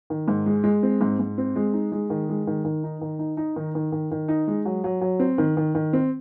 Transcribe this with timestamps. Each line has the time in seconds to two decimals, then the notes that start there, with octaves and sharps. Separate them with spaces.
0.10 D#3
0.28 G#2
0.46 G#3
0.64 G#3
0.83 C4
1.01 G#2
1.19 G#2
1.38 C4
1.56 G#3
1.73 D#4
1.92 G#3
2.10 D#3
2.29 G#3
2.47 D#3
2.65 D#3
2.84 D#4
3.01 D#3
3.19 D#4
3.37 D#4
3.56 D#3
3.75 D#3
3.92 D#3
4.11 D#3
4.28 D#4
4.48 G#3
4.65 F#3
4.84 F#3
5.01 F#3
5.20 C4
5.38 D#3
5.57 D#3
5.75 D#3
5.93 C4